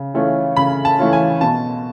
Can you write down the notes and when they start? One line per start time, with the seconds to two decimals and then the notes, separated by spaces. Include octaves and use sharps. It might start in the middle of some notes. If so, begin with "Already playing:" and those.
Already playing: C#3
0.14 E3 A3 C#4 F4
0.57 C#3 B5
0.85 A5
0.99 E3 A3 C#4 F4
1.13 G#5
1.41 B2 A5